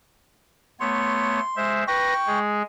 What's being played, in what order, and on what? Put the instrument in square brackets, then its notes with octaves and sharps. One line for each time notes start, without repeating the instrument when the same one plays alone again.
[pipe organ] A3 B3 C#5 [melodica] C6
[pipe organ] G#3 C5 E5
[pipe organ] B4 A#6 [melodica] G5 C#6
[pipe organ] G#3 G#4